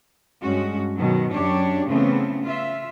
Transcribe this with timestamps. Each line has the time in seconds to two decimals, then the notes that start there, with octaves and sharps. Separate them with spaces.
0.41 G2 G#3 C#4 F#4
0.97 B2 D#3 F#3
1.32 F#2 D4 G4 C#5
1.87 C#3 E3 A3 B3 C4
2.44 F4 E5